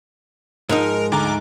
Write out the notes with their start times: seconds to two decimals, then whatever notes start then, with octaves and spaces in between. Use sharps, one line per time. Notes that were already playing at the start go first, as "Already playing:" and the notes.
0.69 G#2 F3 G#3 D#4 A#4 D#5
1.12 D2 A#5 D6